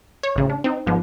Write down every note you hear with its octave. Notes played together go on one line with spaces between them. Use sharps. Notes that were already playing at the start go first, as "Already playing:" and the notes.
C#5
A1 C#3
D4
C4 D#4
G#1 F3 B3